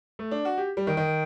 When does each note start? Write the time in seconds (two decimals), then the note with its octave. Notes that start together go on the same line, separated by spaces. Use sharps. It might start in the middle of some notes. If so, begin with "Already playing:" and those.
0.19 A3
0.31 D4
0.45 F#4
0.57 G4
0.77 G3
0.87 D#3
0.97 D#3